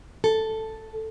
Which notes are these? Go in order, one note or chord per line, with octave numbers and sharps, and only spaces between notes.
A4